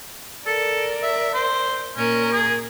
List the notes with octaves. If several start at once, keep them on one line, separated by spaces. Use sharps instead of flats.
A4 A#4 D5
E5
C5
A#2 C#4 A#4
G#4